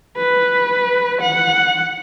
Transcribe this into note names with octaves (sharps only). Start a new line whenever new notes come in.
B4
F#5